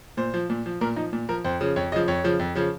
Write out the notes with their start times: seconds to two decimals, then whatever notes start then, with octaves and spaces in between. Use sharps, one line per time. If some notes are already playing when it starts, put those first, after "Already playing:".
0.17 A#2 C5
0.34 F3
0.50 A#2
0.66 F3
0.81 A#2 A#4
0.96 F3 D#4
1.13 A#2
1.29 F3 A#4
1.44 F2 C5
1.61 C#3 F3
1.76 F2 C#5
1.92 C#3 D#5
1.96 F3
2.08 F2 C#5
2.24 C#3 F3
2.39 F2
2.55 C#3 F3